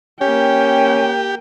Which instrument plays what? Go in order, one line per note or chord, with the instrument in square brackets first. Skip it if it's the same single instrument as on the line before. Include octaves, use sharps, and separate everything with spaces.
[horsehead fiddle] A#3 G5 [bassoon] C#4 [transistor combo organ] G4